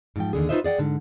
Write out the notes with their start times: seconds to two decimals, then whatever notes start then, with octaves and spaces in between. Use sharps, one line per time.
0.16 G#2 F3 G5
0.33 D#2 D3 G#4
0.49 D#4 F4 B4 C5 D#5 E5
0.64 G#4 D5 F#5 G5
0.79 G#2 D3